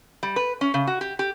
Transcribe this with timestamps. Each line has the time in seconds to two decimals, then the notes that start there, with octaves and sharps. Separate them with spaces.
0.23 G3
0.36 B4
0.61 C#4
0.74 C#3
0.87 F#4
1.01 G4
1.19 G4